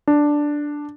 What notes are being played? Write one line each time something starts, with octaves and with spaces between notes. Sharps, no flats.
D4